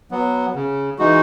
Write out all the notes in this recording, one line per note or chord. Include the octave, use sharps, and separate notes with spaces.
F#3 B3
C#3
E3 G#3 D#4 F#4